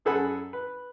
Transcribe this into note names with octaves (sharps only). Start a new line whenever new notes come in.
F#2 G#4 A4 F#5 G#5 B5
B4